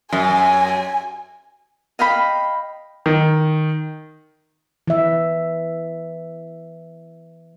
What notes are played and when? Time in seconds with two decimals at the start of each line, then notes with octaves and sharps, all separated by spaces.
0.13 F#2 G#5
1.99 D#5 F5 G5 B5
3.06 D#3
4.88 E3 E5